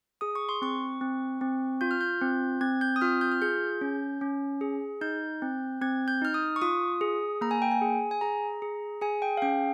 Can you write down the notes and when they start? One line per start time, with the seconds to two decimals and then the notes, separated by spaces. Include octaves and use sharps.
0.21 G#4 D#6
0.35 C#6
0.49 C6
0.62 C4 C#6
1.01 C4
1.41 C4
1.81 F4 G6
1.91 F6
2.01 G6
2.21 C4
2.61 C4 G#6
2.81 G6
2.96 D#6
3.01 F4 F6
3.21 G6
3.32 F6
3.42 G#4 G6
3.81 C#4
4.21 C#4
4.61 G#4
5.01 D#4 G6
5.42 C4
5.81 C4 G#6
6.08 G6
6.22 D#4 F6
6.34 D#6
6.56 C#6
6.62 F4 D#6
7.01 G#4
7.41 A#3 A#5
7.51 G#5
7.62 G5
7.72 G#5
7.82 G#4
8.11 G#5
8.21 G#4 A#5
8.62 G#4
9.01 G#4 G#5
9.22 G5
9.37 F5
9.42 C#4 G5